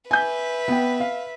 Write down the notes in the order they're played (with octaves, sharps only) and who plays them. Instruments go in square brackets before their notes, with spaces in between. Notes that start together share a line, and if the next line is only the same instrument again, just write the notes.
[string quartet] B4 E5 [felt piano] G#5 G6
[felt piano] B3 G5
F5